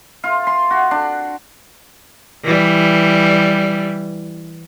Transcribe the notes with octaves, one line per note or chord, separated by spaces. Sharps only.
F4
C6
F#4
D4
E3 G3